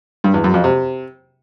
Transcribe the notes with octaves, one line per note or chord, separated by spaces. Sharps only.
G2
E2
F#2
F2
C3